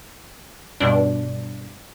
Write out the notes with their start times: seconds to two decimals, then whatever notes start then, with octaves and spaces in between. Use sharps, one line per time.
0.80 G2 B2 D4